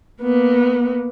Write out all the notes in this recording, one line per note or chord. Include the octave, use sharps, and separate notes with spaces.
A#3 B3